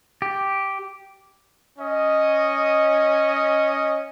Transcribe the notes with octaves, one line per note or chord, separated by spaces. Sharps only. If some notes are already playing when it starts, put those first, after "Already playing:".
G4
C#4 D#5